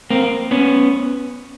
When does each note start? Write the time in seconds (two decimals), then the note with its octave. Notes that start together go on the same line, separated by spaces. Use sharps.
0.10 A#3 C4
0.51 B3 C#4